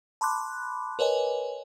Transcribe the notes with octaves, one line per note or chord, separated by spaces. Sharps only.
A5 B5 C6 D6 F#6
A#4 B4 C#5 D#5 G#5